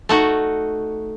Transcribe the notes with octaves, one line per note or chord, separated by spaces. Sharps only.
A3 D#4 F#4